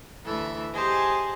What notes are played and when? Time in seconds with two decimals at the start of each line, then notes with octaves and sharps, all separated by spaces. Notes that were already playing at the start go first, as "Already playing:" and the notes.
0.24 D2 E3 A4 E5
0.73 G4 G#4 C5 D#5 G#5 A5